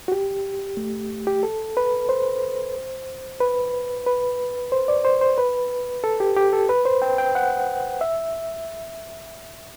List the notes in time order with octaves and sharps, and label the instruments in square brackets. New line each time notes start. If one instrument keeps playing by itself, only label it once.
[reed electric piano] F#4
G4
A3
G4
A4
B4
C5
B4
B4
C5
D5
C5
C5
B4
A4
G4
G4
A4
B4
C5
G5
G5
F#5
E5